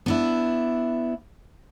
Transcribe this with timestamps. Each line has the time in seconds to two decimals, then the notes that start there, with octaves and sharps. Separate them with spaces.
0.06 B3 D4 E4